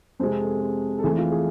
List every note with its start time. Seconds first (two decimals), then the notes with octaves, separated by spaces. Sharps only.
0.19 F2 C3 G#3 C5
0.41 A4
0.62 A4
0.98 A4
1.04 F2 E3 A3 G#4
1.18 F4
1.32 G#4